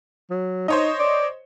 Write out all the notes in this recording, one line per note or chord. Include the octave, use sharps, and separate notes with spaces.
F#3
D#4 C5 C#5 D#5
D5